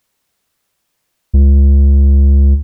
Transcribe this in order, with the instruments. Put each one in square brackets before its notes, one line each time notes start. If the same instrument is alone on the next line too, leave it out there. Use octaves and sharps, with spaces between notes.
[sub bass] C#2